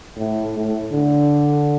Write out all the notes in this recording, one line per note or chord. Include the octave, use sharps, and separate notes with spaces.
A2
A2
D3